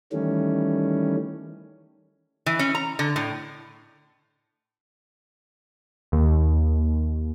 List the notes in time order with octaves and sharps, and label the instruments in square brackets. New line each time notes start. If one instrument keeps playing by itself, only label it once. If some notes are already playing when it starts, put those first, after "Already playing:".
[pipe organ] D#3 E3 G3 A3 C#4
[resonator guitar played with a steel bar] E3
C#4
A#5
D3
A2
[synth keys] D#2